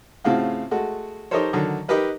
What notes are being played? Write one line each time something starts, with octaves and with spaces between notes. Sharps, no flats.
A2 C#3 C4 F4 F#4
G#3 A3 F#4
D#4 G4 A4 A#4 C5 C#5
D3 D#3 F#3
D#4 G4 A#4 B4 D#5